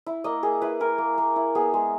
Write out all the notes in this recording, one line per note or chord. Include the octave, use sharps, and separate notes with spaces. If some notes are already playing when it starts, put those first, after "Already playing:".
E4
A#3 D#5
A#3 G#4
E4 B4
E4 A#4
A#3
A#3
E4
B3 G#4
G#3